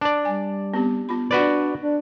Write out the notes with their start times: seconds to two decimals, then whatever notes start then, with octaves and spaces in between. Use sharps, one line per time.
0.01 D4 D5 A5
0.25 G3 G#5
0.74 B3 C4 G4
1.09 B3 F4 B5
1.31 D4 F#4 B4 D5
1.80 D4